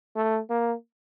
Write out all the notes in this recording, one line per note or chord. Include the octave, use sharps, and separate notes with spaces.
A3
A#3